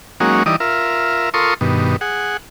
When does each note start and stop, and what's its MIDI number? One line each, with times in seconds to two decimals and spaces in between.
0.20 0.43 54
0.20 0.43 56
0.20 0.43 58
0.20 0.43 61
0.20 0.43 63
0.20 0.43 66
0.46 0.56 52
0.46 0.56 55
0.46 0.56 63
0.46 0.56 74
0.46 0.56 75
0.60 1.29 65
0.60 1.29 70
0.60 1.29 76
1.34 1.54 65
1.34 1.54 69
1.34 1.54 70
1.34 1.54 84
1.34 1.54 85
1.34 1.54 87
1.61 1.96 43
1.61 1.96 47
1.61 1.96 51
2.01 2.37 68
2.01 2.37 78